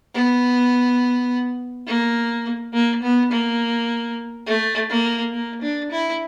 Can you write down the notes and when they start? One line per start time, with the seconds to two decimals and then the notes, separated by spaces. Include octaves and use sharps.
0.15 B3
1.87 A#3
2.73 A#3
3.03 B3
3.32 A#3
4.46 A3
4.90 A#3
5.33 A#3
5.62 D4
5.92 E4